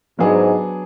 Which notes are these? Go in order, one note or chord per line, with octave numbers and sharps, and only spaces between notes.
G#2 F#3 B3 D4 G#4